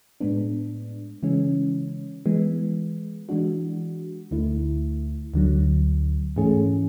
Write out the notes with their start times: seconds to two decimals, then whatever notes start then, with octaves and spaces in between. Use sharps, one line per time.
0.20 A2 G#3 B3 D4
1.23 C#3 E3 G#3 C#4
2.26 E3 G#3 B3
3.29 E3 G#3 D4 F#4
4.31 D2 D3 A3 E4
5.34 D2 D3 F#3
6.36 G#2 E3 A3 C#4 G#4